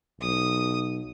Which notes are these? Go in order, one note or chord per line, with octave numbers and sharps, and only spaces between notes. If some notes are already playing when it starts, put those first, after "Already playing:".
B1 D#6